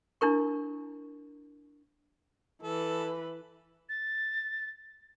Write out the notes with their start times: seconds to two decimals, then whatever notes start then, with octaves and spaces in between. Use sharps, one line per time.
0.21 D4 E4 A#4 C#6
2.63 E3 A4 B4
3.89 A6